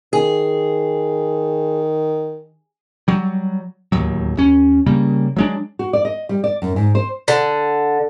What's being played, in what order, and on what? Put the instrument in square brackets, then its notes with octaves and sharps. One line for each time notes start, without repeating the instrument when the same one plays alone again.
[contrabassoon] D#3 [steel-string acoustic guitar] G#4
[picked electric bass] F#3 G3
D1 D#2 F#3
D#2 C#4
C#3 G3 A#3
F#3 G#3 D4
[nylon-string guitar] F#4
D5
D#5
G3
D5
F#2
G#2
C5
[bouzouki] D3